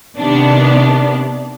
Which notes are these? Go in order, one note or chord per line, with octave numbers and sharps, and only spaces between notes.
C3 D#3 B3 D4